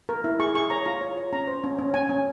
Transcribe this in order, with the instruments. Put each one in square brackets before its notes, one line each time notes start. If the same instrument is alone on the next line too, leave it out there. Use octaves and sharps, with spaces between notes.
[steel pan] A#4
E4
G#4 C#6
G#4 C#6
C#5 A#5
F4 A#5
C#5
C#5
C#4 A#5
C5
C#4
C#4
C#4 G#5
C#4